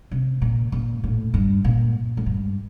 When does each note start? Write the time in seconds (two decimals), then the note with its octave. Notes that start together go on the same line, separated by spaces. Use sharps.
0.11 C3
0.42 A#2
0.72 A#2
1.04 A2
1.34 G2
1.65 A#2
2.17 A2
2.26 G2